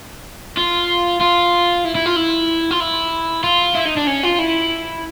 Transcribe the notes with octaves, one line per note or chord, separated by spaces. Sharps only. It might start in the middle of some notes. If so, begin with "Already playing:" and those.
F4
F4
E4
E4
F4
E4
F4
E4
F4
E4
D#4
D4
C#4
F4
E4